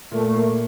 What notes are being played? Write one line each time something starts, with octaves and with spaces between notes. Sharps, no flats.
A#2 A3
A#3